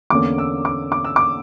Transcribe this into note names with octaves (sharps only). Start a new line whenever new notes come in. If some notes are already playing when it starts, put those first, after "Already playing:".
E2 D3 A#3 C#4 D6
E6
D6
D6
E6
D6